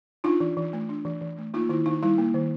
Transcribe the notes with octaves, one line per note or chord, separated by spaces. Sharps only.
D4 D#4 F4
E3
E3
A3
D4
E3
E3
A3
A#3 D#4 F4
D#3 E4
D#3 D#4
G3 E4
A#3
D#3